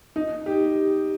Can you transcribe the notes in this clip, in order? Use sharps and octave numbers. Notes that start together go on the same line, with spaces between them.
D#4
G4